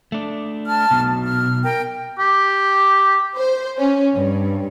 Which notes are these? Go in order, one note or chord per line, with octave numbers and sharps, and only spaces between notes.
A3 D4
A5 F6
B1 B2
F6
A#4 G5
G4
C5
C#4
G2